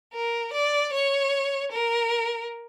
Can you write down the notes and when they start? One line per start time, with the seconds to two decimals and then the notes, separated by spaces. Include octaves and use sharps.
0.14 A#4
0.53 D5
0.93 C#5
1.72 A#4